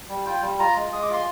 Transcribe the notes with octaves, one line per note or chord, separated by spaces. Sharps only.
G3
F4 G5
G3
F4 A#5
G#3
G#3 D#6
D6
F4 C6